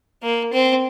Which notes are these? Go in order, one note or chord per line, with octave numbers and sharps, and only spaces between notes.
A#3
C4